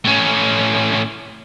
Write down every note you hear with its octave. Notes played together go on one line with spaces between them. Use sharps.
A2 C#4